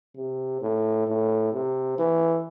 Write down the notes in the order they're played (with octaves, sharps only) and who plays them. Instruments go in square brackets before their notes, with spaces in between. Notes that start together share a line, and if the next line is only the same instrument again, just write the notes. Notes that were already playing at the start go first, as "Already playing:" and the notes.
[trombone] C3
A2
A2
C3
E3